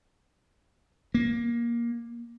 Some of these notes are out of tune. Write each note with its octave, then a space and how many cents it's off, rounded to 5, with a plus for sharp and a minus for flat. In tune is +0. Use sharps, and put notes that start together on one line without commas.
A#3 +15